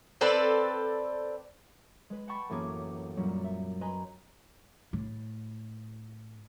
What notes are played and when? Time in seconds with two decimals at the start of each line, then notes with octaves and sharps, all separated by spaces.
0.21 C4 A4 B4 D5
2.10 G#3 B4
2.28 F#5 G5 A5 B5 C#6 A6
2.49 A1 F#2 A#3 B3 G#4 D6
3.17 F#2 A#2 F#3 G3
3.44 E5
3.81 B4 D#5 G#5 A#5 C6
4.93 A2